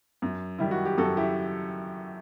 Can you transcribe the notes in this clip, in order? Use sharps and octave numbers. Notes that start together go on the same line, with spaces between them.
F#2
D#3 G3 E4
F#4
G4
F#2 F#4 A4
E4 G4